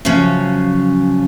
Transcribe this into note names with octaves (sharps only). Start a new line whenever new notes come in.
C#3 F3 F#3 C#4